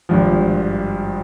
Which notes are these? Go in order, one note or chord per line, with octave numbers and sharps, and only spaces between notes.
G#1 G2 F3